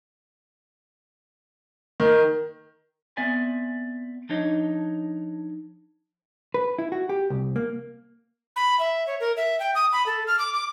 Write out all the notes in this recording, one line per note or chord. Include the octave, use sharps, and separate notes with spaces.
D#3
B3 C4 D5 E5 G#5
F3 D4 D#4 C#5 D#5
B4
E4
F#4
G4
C2
A#3
B5
E5
C#5
A#4
E5
G5
D#6
B5
A4
F6
D6
D6